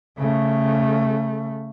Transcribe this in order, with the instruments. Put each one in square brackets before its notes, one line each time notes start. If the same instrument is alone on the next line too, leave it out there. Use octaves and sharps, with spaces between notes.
[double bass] C#3 A3